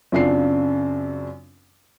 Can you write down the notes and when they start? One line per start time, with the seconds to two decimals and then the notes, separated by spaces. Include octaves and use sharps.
0.12 F#2 C#3 C4 D4 F4 C7